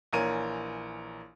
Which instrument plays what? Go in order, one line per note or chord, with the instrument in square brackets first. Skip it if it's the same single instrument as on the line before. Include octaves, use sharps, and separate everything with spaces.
[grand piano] A#1 E3 A#4 C#5 D#7